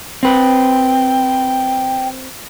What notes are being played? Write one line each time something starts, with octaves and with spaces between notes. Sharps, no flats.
C4 B4 G5